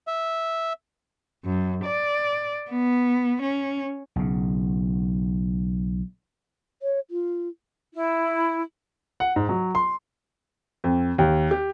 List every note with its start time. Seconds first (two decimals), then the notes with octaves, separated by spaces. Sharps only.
0.07 E5
1.45 F#2
1.85 D5
2.70 B3
3.42 C#4
4.16 B1 C#3
6.82 C#5
7.10 F4
7.93 E4
9.20 F#5
9.36 G#2
9.49 F#3
9.75 C6
10.84 F2
11.18 D#2
11.51 G4